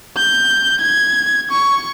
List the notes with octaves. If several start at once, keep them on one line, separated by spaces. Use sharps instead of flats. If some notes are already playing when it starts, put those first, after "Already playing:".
G6
G#6
C#6